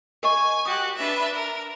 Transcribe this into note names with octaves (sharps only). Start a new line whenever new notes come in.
A#4 D#5 G#5 C#6
F#4 G4 D#6 F#6
D4 B4 E5
A#4